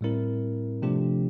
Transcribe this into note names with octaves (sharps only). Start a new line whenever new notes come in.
A2 G3 C4 E4 A#4
C3 F3 A3 D4 G4